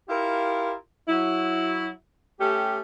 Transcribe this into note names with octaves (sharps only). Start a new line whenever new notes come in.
E4 F4 G4 A#4
F#3 E4
A3 C#4 G4